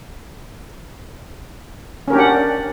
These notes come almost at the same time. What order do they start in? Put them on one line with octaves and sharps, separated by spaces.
C#4 A#4 G4 D4 F#5